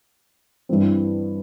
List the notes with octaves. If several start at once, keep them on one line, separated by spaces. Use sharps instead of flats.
G2 E3 G3 C4